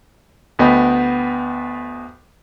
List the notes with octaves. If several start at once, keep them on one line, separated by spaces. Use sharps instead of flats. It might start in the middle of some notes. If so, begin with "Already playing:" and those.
D2 B3 D#5 G5 B5